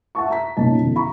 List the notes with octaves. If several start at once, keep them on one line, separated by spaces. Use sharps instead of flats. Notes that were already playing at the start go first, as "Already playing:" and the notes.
E5 F#5 A5 C#6
A#5 B6
B1 A#2 C#4 D#4 D#5 A5
E2 B2 D3 F3
A#5 B5 C#6